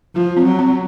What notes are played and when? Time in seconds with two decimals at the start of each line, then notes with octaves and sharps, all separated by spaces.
0.16 F3 F4
0.37 C4
0.45 F#3
0.59 C4